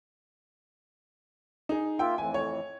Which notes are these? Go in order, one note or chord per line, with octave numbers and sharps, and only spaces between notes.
D#4 G#4
A#3 F4 E5 G5
F2 A2 E3 G#5
C#5